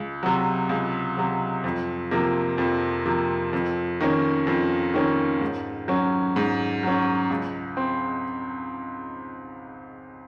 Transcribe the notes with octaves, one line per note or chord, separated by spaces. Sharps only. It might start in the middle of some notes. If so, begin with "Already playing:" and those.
Already playing: C#2
C3 F#3
C#2
C3 F#3
F2
C3 F3 A#3
F2
C3 F3 A#3
F2
D#3 A#3 C#4
F2
D#3 A#3 C#4
G#2
F#3 C#4
G#2
F#3 C#4
C#2
C4